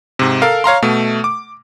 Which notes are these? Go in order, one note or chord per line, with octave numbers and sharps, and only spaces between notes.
G#2 C3
A4 A#4 F5
C#5 F5 A#5 C6
B2 A3
D6